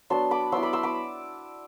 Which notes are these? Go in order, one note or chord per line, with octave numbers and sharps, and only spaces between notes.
F#3 B3 D4 A5 C6
B5 D6
F#3 B3 E4 C6 E6
B5 D6
C6 E6
B5 D6